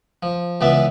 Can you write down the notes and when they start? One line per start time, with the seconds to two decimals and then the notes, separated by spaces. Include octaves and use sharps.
0.23 F3
0.61 C#2 E3 B3 D5 E5